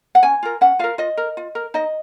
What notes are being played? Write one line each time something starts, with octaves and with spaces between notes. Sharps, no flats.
F#5
C#4 G#5
F4 A#4
C#4 F#5
F4 A#4 F5
F4 D#5
A#4
F4
A#4
D#4 D#5